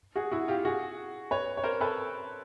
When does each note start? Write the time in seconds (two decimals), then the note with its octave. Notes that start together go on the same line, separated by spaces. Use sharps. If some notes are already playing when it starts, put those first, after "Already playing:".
0.16 F#4 G#4
0.32 E4 F#4
0.48 F4 G4
0.65 F#4 G#4
1.31 B4 C#5
1.57 C#5
1.64 A#4 C5
1.80 A4 B4